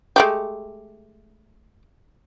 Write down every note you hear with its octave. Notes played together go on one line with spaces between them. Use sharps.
G#3 A3 G4